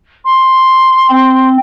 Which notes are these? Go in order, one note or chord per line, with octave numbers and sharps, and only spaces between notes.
C6
C4